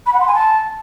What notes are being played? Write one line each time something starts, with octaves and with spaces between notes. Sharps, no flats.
B5
F#5
C6
G#5
A5